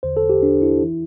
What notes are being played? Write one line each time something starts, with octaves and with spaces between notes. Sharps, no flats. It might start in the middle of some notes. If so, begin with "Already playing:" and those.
E2 D3 C5
A4
G4
D4
E4
E3